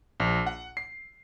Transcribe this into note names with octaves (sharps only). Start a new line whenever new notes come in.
A#1
F#5
C7